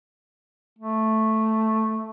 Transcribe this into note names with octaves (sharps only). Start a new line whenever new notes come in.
A3